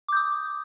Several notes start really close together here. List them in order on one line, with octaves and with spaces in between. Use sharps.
D6 G6 D#6